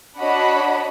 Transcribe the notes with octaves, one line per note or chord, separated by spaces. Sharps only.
D4 F#4 C#5 D#5 F#5 B5